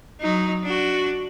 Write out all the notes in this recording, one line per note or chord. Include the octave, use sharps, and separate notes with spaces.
F#3 D#4
D4 F#4